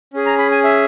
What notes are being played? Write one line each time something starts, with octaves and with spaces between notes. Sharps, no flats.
C#4 G#4
A#5
B5
G#5
E5